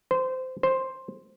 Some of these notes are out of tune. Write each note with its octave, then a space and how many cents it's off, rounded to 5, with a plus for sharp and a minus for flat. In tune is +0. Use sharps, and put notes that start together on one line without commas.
C5 -20
C5 +5